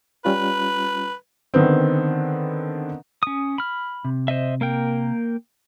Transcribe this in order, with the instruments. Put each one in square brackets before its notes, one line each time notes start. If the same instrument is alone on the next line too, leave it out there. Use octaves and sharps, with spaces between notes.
[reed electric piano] G3 C#4 F4 [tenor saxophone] B4
[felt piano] D3 D#3 B3 C4
[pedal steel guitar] C#4 D#6
B5 F6
[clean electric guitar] C3
[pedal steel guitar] C5 D#5 E5
A#3 A#4 G5